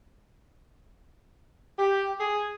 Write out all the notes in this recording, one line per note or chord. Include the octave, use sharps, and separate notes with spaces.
G4
G#4